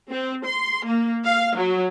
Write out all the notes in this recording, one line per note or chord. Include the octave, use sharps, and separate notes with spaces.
C4
C6
A#3
F5
F#3